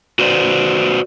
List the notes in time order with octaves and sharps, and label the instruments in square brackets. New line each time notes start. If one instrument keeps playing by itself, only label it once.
[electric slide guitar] F#4 B4 C5 D5